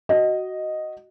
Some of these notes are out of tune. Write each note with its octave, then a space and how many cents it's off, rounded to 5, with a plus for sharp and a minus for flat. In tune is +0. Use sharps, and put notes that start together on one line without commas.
F#4 +10 D#5 +0